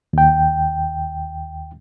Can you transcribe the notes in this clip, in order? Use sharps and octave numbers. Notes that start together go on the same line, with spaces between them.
D#2 G5